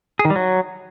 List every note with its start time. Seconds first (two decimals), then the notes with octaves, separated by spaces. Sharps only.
0.19 G#4
0.25 D#3
0.30 G3
0.36 F#3